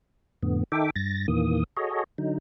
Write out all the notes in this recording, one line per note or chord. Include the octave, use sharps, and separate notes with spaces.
F2 A2 D3 B3
D#3 D#4 A4 E5 G5 D6
G2 A6 A#6
E2 A#2 D#3 E3 A#3 D#6
F#4 G#4 A4 C#5 D#5
D3 F#3 D#4